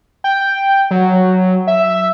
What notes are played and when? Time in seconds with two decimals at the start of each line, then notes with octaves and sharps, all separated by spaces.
0.24 G5
0.91 F#3
1.67 E5